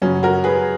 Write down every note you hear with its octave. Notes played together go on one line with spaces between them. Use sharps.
F#2 C#3 F#3 C#4
F#4 A#4
G#4 B4